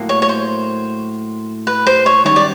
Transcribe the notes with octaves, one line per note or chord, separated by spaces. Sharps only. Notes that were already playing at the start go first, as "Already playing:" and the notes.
Already playing: A2 F#3 A#3
C#5
C#5
C5
B4
C5
C#5
F#2 D#3 G3 C#5
D5